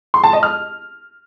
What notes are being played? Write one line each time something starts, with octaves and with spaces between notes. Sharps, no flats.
C6
A5
D#5
F6